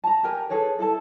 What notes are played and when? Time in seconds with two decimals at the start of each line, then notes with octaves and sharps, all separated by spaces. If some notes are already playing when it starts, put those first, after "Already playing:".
0.04 A5 A#5
0.23 G4 A#4 G#5
0.50 G#4 A4 B4 C#5
0.79 E4 A4 A5